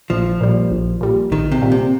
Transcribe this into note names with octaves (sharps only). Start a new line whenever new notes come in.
A#1 F3
A#2 G3
A#1
A#2 G3
A#1 D#3
C3
A#2 G3
C3